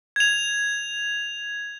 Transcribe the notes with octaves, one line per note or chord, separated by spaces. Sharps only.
G#6 F7